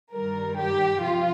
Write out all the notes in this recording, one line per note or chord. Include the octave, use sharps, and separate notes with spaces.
G2 D#3 G3 A#4
G4
C3 F3 F4